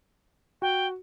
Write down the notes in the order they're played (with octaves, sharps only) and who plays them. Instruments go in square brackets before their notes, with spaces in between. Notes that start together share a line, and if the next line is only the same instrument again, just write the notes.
[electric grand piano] F#4 [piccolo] G5